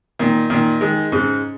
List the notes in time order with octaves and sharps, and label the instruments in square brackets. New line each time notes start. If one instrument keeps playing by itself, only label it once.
[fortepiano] A#2 D#3
A#2 D#3
D#3 G#3
G#2 C#3